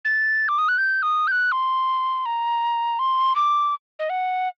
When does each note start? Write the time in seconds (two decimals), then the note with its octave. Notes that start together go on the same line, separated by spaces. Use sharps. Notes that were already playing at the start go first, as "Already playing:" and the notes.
0.05 A6
0.49 D6
0.58 D#6
0.68 F#6
0.78 G6
1.03 D#6
1.27 G6
1.32 F#6
1.52 C6
2.26 A#5
2.99 C6
3.36 D6
3.99 D#5
4.10 F#5